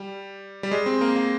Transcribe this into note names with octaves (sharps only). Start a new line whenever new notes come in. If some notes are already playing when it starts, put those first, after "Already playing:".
Already playing: G3
G3
G#3
C4
A#3
A#3